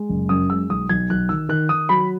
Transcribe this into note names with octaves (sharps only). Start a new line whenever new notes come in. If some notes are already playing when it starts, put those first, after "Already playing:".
Already playing: G#3
F#1
F#2 D#6
G#3 E6
B1 D#6
B1 G#6
B1 F#6
D#3 E6
D#3 F#6
D#3 D#6
F#3 B5